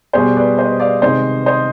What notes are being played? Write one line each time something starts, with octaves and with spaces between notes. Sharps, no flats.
B2 G3 G#4 C5
B4 D5
C5 D#5
D5 F5
C3 D#3 G#3 C5 D#5
C5 D#5